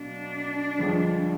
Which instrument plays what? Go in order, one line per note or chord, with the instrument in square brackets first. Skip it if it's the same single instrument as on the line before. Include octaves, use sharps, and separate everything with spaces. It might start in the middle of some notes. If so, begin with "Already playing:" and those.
Already playing: [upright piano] B2 F#3 A#3 [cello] D4
[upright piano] G1 F2 D3 F3 G#3